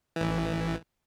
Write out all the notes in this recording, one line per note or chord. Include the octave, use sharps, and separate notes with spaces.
A1 E3